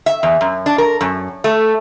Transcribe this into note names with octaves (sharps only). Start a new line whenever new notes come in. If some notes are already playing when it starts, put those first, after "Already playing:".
E5
E2
F#2
D4
A#4
F#2
A3